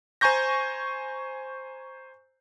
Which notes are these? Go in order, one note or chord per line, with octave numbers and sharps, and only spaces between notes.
C5 G#5 A#5 C#6 G6 A#6